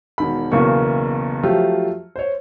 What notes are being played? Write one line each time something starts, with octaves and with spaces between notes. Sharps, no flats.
E1 D#3 B5
B1 E2 C#3 A#3 A#4 C#6
F3 F#3 A3 F4 G4
C5 C#5